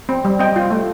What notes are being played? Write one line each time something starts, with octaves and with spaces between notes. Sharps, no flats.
C4
G3
C4 D#5 G5
F4
A3